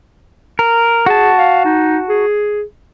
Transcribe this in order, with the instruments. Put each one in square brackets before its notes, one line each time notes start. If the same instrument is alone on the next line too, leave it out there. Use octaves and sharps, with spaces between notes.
[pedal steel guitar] A#4
[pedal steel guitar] F#4 A5 [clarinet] G#4
[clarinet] F5
D#4
G#4